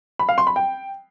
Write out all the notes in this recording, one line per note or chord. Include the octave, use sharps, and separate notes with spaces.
B5
F5
C6
B5
G5